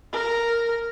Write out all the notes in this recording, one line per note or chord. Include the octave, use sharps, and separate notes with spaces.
A#4